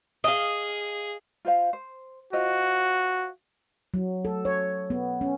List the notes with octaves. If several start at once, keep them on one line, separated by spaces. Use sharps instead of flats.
G#4 D#5 F5
F4 C5 F5
C5
F4 F#4 C5 D#5
F#3
A4
C#5
B3
C#4